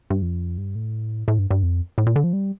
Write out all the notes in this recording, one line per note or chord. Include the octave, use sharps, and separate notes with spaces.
G2
F2
G2
A2
A2
G2
G2
F2
A2
A#2
D3
F3
G3